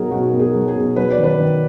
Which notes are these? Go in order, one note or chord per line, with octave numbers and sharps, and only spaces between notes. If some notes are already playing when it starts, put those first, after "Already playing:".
Already playing: B2 F#3 B3 D#4 G#4 A#4
B2 F#4
B3
G#4
F#3
G#4
B2
F#3 B4
D5
D#3
B4
D#3